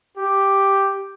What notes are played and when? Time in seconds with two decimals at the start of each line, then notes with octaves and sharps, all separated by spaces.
0.17 G4